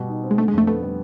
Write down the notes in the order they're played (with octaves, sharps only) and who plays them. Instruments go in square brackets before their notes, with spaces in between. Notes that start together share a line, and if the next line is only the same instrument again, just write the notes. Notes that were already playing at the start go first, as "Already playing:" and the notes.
Already playing: [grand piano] B2 G3
D#4
C4
[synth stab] G#3
[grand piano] D3 [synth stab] A3
[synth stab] G#3
[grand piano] F2 [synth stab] A3
[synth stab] A3 [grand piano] B3
[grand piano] G3